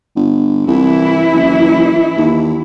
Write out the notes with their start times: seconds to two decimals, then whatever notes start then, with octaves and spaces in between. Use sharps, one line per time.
0.16 G1
0.67 C2 E3 E4
1.33 F#1
2.18 D#2